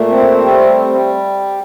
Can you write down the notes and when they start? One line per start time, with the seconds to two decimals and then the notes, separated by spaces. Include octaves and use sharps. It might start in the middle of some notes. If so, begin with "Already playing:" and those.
Already playing: A#2 A3
0.09 C4
0.40 G3
0.87 G3